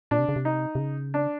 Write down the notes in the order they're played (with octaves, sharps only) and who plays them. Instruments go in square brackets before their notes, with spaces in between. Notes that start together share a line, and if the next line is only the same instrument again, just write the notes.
[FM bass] A#2 [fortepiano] D4
[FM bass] C3
C#3
C3
[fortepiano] D#4
[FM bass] C3
C#3
[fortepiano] D4